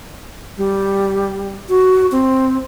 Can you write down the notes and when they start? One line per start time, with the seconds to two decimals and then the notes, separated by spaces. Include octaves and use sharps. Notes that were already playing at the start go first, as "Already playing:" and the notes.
0.57 G3
1.69 F#4
2.12 C4